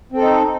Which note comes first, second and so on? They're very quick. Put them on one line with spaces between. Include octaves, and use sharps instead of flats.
C4 A4 D#4